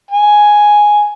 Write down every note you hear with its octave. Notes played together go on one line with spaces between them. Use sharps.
G#5